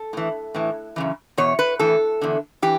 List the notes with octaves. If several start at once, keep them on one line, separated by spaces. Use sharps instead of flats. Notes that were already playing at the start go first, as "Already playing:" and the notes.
Already playing: A4
A2 E3
A2 E3
F#2 C#3 E3
E2 B2 C#5
B4
A2 E3 A4
E2 D3
E3 G4